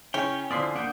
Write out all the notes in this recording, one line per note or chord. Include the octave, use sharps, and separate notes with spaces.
C#3 C#4 E4 C#5 G5
D3 F3 C4 E4 D5 D#6 B6 C7
A#3 D4 F#5 G6